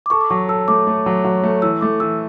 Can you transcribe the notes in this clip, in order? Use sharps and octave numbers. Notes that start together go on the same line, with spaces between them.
D6
A4 C#6
D6
F#3 C#6
A4 E6
A3 D6
A3
F#3
F#3
A3
E3 E6
A3 D6
E3 E6